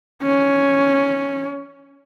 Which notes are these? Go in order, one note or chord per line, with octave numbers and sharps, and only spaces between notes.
C#4